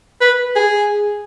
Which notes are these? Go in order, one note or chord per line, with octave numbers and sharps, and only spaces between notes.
B4
G#4